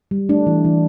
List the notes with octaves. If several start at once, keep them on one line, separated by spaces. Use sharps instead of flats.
G3
A3 D4
E3
E3